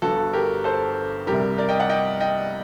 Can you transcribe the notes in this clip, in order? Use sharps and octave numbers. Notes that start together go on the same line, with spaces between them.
G1 G2 D3 F#4 A4
G4 A#4
A4 C5
C2 C3 G3 G4 A#4
A#4 D5
D#5 G5
D5 F#5
D#5 G5
D#5 G5